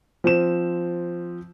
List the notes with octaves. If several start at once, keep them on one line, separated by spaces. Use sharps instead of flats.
F3 C4 E7